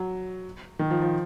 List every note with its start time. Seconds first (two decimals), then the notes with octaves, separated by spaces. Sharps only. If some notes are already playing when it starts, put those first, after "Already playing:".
Already playing: F#3
0.79 D#3
0.90 F3
1.02 F3